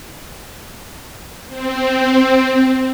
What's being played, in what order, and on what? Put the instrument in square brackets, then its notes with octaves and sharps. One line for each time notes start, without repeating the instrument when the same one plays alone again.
[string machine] C4